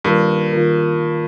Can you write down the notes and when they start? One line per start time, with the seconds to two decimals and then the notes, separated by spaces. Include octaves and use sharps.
0.05 G2 D#3 A#3 F4 A#4
0.53 D#3 A#3 F4 A#4